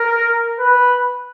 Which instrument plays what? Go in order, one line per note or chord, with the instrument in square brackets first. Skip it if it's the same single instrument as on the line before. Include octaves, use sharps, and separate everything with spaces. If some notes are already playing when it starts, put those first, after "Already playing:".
Already playing: [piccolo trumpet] A#4
B4